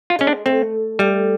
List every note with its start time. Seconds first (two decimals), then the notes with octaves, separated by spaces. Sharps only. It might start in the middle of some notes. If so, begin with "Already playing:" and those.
0.10 F4
0.19 G#3 C#4
0.27 D4
0.46 A3 C4
0.99 G3 A3